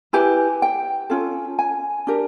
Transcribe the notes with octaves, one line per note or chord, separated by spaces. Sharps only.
E4 G4 B4 G#5
G5
C#4 F4 A4
G#5
D4 G4 A#4